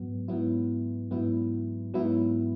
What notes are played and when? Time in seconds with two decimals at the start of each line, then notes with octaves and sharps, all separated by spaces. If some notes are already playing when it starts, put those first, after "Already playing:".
Already playing: G#2 F#3 B3
0.28 G#2 F#3 B3 E4
1.11 G#2 F#3 B3 E4
1.94 G#2 F#3 B3 E4